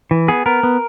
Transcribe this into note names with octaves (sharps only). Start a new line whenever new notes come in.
E3
B3 G#4
B3 A#4
B3